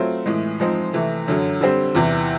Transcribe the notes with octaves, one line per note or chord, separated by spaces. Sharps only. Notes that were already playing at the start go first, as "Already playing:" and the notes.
Already playing: F#3 A3 C4 F4
A2 E3 G#3
F3 G#3 C4 D#4
C3 E3 A3
F#2 D3 F#3
D3 G3 C4
E2 C3 E3